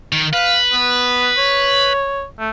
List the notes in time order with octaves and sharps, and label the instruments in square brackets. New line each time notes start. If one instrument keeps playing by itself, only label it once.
[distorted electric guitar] D#3
[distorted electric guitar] B4 [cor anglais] F5
[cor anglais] B3
C#5
A3